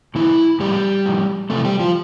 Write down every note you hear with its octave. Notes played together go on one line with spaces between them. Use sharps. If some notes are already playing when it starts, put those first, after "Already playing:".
A2 E3 F3 E4
A2 F3 G3 G4
A2 F3
F2 C3 E3 A3 A4
G3 G4
F3 F4